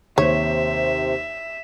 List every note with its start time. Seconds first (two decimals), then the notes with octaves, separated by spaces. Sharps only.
0.18 D#2 C3 C5 C#5 E5